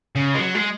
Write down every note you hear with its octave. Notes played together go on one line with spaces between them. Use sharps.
C#3
G#3
F#3
G#3